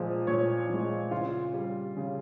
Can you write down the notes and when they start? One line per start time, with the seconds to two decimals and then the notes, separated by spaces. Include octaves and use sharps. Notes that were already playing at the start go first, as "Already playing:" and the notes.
Already playing: A#2 F3 G#3
0.27 A#2 C#5
0.70 F3 G#3
1.11 C#3 F4
1.54 G3
1.97 C#3